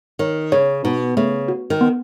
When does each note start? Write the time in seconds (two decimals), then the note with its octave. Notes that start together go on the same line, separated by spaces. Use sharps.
0.19 D#3 C#5
0.52 C#3 C#5
0.84 B2 D#4
1.17 C#3 A3
1.48 F#4
1.70 D#3
1.81 B3